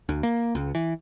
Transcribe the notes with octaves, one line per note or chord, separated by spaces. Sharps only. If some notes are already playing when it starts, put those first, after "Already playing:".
D2
A#3
C#2
E3